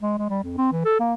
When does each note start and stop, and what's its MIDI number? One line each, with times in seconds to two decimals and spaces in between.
0.02 0.14 56
0.18 0.27 56
0.30 0.40 55
0.44 0.56 41
0.58 0.70 60
0.72 0.82 52
0.85 0.96 69
0.99 1.14 58